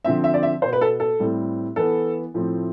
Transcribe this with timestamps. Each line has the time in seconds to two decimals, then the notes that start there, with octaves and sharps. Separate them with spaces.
0.05 D3 F3 C4 E5
0.24 E5
0.34 D5
0.43 E5
0.62 B2 B3 C5
0.73 B4
0.81 A4
1.00 A4
1.20 A2 G3 C4
1.76 E3 B3 A4
2.34 A2 F3 A3 C4